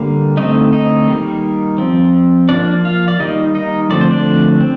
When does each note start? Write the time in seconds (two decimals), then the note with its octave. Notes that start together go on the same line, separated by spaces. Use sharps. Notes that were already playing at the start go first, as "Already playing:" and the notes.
Already playing: D3 G3 A#3
0.37 D3 A3 C4 D#4 D#5
0.73 D#4 D#5
1.08 D#3 G3 A#3
1.78 F3 C4
2.49 F3 A#3 D4 D5
2.85 F4 F5
3.08 D5
3.19 D#3 G3 A#3 D#4 D#5
3.55 D#4 D#5
3.90 D3 F3 A3 C4 D5
4.01 C5
4.11 D4 D5
4.61 C4